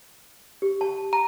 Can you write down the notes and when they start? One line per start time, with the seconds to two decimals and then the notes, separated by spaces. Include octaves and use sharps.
0.62 G4
0.81 A5
1.13 A#5